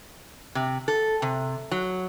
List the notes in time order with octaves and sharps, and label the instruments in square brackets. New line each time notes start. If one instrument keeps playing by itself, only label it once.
[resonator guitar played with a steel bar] C3
A4
C3
F#3